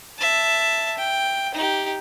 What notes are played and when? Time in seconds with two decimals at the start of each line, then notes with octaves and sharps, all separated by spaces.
0.19 E5 A5
0.97 G5
1.54 D#4 G4